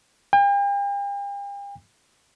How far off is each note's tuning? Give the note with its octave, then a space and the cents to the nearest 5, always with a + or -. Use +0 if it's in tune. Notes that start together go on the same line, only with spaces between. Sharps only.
G5 +45